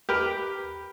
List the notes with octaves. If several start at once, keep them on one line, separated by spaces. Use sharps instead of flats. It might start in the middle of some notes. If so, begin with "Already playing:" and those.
G4 A#4 B4